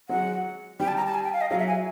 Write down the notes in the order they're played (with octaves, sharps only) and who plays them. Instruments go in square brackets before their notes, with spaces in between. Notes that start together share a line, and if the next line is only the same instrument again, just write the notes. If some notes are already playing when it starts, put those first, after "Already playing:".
[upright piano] F#3 G#3 [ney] F#5
[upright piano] G3 [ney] G5
[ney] A5
A#5
A5
G#5
G5
F5
D#5
[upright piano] F#3 [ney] F5
[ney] E5
G#5